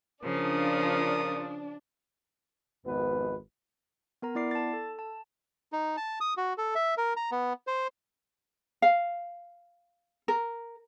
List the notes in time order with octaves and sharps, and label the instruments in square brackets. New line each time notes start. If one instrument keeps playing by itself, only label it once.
[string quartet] C#3 F3 [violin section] D4 [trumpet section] F4 D#6 [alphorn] A#4
[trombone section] G#1 F2 B2 B3 B4
[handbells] B3 A#4 A#5
B3 E4 D5 D6 C7
A5 A6
A4
A5
[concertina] D#4
A5
D#6
F#4
A4
E5
A#4
A#5
B3
C5
[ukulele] F5
A#4